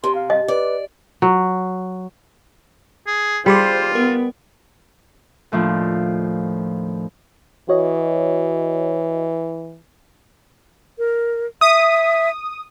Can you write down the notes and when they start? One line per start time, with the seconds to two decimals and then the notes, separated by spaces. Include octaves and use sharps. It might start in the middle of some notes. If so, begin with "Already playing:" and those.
0.04 C3 C6
0.15 F5
0.30 D#5
0.48 B4 D5
1.22 F#3
3.07 G#4
3.46 G3 F4 G#4 A4 C5 C6 D6
3.95 B3 A#4
5.52 D#2 A2 F3 D4
7.69 E3 F#4 C#5 D#5
10.98 A#4
11.61 E5 D#6